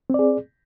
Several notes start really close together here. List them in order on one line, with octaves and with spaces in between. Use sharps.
C4 D5 G#4